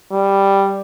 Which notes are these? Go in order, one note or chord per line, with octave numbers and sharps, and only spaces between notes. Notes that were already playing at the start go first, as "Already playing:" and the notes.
G3